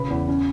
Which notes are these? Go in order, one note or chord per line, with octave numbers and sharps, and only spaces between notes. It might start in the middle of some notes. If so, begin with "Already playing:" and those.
Already playing: C#3 B4 B5
E2
C#4